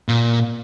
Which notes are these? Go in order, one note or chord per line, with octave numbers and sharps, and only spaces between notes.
A#2